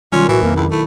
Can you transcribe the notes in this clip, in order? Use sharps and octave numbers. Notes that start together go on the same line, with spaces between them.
B1 D#3 G3 C#4 F4
A2 E3 F#4
F2 A#3
C#2 E4
A3 E4